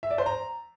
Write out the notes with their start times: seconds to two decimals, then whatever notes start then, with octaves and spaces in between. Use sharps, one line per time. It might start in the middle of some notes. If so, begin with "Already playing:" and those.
0.03 E5
0.11 D5
0.18 C5
0.26 A#5